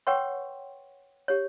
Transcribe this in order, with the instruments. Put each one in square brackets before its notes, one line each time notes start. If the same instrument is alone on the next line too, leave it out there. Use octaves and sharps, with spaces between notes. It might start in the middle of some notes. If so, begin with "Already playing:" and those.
[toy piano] B4 C#5 F#5 G5 C6 C#6
G4 C#5